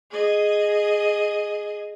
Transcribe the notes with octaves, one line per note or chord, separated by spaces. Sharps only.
G#4 D#5